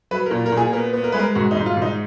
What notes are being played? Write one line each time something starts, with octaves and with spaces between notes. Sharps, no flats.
F#3 B4
A#4
A#2
A#4
A#2
G#4
B3 A#4
B3
A#4
G#3 B4
A#4
G#2 F#4
D#4
G#2
F4
G#2 D#4